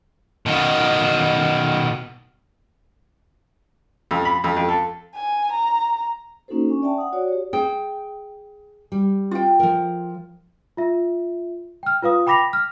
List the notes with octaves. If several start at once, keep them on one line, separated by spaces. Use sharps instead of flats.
B2 D#3
F2
B5
F2
F2
A4
G#5
A#5
A#3 C#4 D#4 F#4 A4 C5
C#4 D4 G#5 C#6
D5 E5 G5 A5
F#5 D#6
F#4 C#5 D5
G4 C#5
G#4 G5
G3
F4 G5
F3 A#4
F4 E5
G5 F6
F4 B4 F5 D#6
G5 B5 D6 A#6 B6 F7
F6